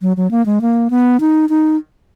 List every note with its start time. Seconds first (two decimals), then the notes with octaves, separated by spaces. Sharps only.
0.02 F#3
0.17 F#3
0.31 A#3
0.46 G#3
0.61 A#3
0.90 B3
1.21 D#4
1.49 D#4